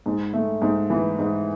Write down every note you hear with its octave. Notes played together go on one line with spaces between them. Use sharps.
G#2
A3
G#2
E3
G#2